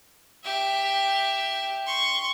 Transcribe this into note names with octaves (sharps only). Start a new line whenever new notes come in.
G4 E5
C6 C#6